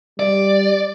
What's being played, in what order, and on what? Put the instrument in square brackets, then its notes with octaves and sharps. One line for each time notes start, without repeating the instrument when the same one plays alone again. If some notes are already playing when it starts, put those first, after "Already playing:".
[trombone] G3 [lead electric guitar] D5